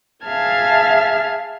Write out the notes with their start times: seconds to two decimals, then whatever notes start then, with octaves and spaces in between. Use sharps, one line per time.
0.25 G#4 E5 F5 A5 F6 G#6